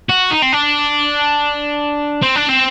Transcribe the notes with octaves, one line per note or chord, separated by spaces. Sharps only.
F#4
D#4
C4
D4
C4
D4
C4